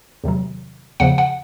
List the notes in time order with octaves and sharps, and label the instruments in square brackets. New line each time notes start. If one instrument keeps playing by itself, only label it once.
[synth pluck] E2 C3 D#3 F#3
E2 C#3 F3 F#5
F#5